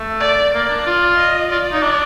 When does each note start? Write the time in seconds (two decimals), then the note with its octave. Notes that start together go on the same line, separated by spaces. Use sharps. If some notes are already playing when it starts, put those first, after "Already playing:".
Already playing: A3
0.20 D5
0.53 A#3 D5
0.70 D4
0.86 F4
1.18 D#5
1.50 F4 D5
1.72 D#4
1.83 D4